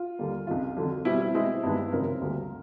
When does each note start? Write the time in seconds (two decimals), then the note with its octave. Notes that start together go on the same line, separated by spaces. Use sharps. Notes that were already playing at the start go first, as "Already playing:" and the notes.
Already playing: F4
0.19 D#2 D3 G3 A#3
0.47 C#2 C3 D#3 F4
0.77 F2 D3 F#3
1.05 B2 G3 C4 E4
1.20 E4
1.34 B2 G#3 C4 E4
1.63 G2 D#3 G#3 B3
1.92 F#2 C#3 F3 G#3 C4 A#4
2.21 D2 D3 G3 A#3